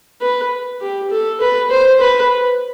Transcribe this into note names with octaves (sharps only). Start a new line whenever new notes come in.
B4
G4
A4
B4
C5
B4